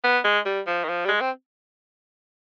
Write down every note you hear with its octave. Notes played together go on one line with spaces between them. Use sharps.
B3
G#3
G3
F3
D#3
F3
G3
G#3
C4